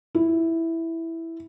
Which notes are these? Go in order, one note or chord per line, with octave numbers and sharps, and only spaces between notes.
E4